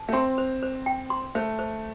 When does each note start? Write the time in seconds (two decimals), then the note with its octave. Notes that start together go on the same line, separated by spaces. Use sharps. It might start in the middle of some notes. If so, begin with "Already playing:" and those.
Already playing: A5
0.09 A3
0.13 C4 C6
0.38 C5
0.63 C5
0.86 G5
1.10 C6
1.35 A3 C5
1.59 C5